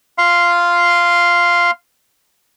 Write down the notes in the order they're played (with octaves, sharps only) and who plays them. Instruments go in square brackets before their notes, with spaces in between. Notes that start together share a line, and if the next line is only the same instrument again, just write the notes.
[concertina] F5 C6